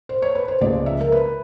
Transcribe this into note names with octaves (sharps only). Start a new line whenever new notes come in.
C5
C#5
B4
C5
C#2 C#3 F3 G#3 D5
E5
A#4
B4